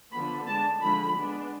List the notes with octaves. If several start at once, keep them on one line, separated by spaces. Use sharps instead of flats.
D3 F3 B3 B5
G#3 D4 A5
D3 F3 G#3 B5
G#3 B3 D4